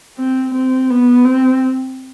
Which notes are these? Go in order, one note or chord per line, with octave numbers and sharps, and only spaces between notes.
C4
C4
B3
C4